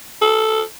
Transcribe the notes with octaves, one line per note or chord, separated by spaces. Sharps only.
A4